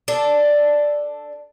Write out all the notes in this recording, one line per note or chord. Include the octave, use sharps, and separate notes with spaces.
D4 A4